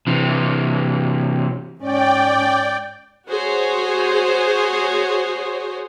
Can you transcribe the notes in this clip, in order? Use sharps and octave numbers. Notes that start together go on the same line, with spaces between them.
C3 E3
G#2 C#4 D5 G5
F#4 G#4 C5 C#5